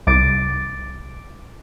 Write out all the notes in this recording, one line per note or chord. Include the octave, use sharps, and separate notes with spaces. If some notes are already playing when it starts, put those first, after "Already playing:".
C2 D6 A6 D7